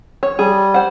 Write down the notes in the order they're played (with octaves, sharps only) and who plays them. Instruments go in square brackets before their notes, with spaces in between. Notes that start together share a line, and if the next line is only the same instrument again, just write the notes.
[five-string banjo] C#5
[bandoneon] G3 [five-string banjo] G#4
[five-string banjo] C5 F#5